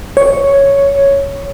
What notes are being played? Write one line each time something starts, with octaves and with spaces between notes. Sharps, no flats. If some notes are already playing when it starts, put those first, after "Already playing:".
C#5